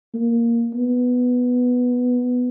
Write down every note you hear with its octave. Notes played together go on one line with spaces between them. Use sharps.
A#3
B3